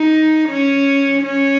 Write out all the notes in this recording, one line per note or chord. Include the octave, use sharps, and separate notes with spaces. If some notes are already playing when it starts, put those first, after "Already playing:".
Already playing: D#4
C#4
C#4